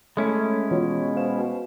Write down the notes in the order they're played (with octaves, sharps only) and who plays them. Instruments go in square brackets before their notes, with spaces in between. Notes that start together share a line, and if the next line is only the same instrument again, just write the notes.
[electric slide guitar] G#3 C#4 E4 [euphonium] A3
[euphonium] B2 [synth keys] E3 F4 C#5
[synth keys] C5 F5 E7